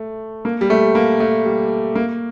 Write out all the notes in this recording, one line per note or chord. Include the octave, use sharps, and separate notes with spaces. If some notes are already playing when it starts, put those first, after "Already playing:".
Already playing: A3
A#3
G3
A3
A#3
A3
G3
A#3